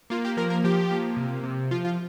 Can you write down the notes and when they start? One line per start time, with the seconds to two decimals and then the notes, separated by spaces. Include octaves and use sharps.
0.10 A#3 F4
0.25 G4
0.37 F3 A#4
0.50 A#4
0.64 F3 G4
0.91 A#3
1.17 C3
1.43 C3
1.71 F3 F4
1.85 F4